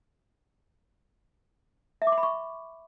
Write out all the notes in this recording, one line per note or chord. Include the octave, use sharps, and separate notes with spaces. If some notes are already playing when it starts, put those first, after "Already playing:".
E5
D6
C6
B5
C#6